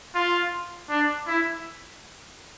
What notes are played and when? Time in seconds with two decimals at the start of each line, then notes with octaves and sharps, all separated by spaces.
0.15 F4
0.89 D4
1.27 E4